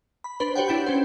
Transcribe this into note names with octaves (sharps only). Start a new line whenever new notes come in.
B5
D4 B4 C5 B5
F#4 G4 C5 C#5 F#5 G5
D4 E4 G5 G6
C#4 C5